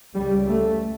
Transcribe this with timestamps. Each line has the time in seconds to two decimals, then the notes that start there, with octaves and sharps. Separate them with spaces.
0.14 C#2 C#3 G3
0.47 A3